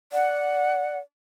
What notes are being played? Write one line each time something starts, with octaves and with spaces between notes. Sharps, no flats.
D5 F#5